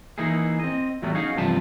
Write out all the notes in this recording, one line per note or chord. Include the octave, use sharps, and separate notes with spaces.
E3 A#3 D#4 E4 G#4
C4 D#5
E2 A2 F#3 G3 A3 B3
C#4 D#4 F#4 G#4 F5
E2 G2 C3 F3 B4 A5